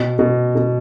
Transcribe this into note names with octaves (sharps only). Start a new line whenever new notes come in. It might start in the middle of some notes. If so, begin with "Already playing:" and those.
Already playing: B2
B2
B2